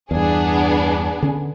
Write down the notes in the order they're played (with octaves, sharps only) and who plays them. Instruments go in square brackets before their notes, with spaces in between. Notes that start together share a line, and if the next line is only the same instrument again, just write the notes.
[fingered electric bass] E2 G2 [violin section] B3 D4 G#4
[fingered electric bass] D3 C#4